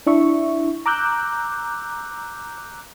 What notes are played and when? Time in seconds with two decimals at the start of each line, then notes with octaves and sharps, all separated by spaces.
0.07 D4 E4 E5 C#6
0.86 A#5 D6 E6 F#6 G6